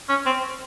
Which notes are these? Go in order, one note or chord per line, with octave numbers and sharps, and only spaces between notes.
C#4
C4